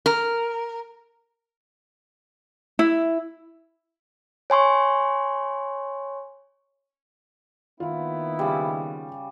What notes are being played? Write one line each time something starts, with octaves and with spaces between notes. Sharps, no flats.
A#4
E4
C#5 G#5 C6 C#6
D#3 A#3 B3 E4 F4 F5
C#3 G3